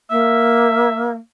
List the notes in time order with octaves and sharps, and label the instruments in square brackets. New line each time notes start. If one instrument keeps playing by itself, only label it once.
[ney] A#3 [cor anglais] E5